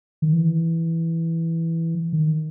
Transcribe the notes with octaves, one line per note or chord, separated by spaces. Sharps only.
D#3
E3
D#3